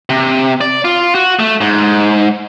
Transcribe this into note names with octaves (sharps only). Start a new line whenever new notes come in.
C3
D5
F4
F#4
A3
G#2